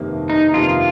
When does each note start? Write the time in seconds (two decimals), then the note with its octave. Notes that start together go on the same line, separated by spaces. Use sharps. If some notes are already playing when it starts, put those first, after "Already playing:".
Already playing: G1 F2 C3 D#3 A#3
0.30 D#4
0.54 G1 F2 C3 D#3 A#3 F4